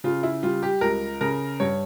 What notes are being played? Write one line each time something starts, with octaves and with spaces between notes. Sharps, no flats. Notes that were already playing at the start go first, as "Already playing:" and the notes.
C#3 F4
E4
G3 F4
G4
C#2 A#4
C#3 A#4
G2 C#5